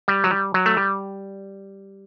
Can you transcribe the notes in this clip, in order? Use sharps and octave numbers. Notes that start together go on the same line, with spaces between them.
G3
F#3
G3
F#3
A3
G3